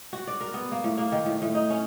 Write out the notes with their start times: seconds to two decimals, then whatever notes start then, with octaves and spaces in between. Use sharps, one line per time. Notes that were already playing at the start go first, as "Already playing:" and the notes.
0.13 F#4
0.27 D5
0.40 A#4
0.54 B3
0.72 A#3
0.84 A2
0.98 A#3
1.12 D#3
1.26 A2
1.42 A2
1.55 D#4
1.70 C#4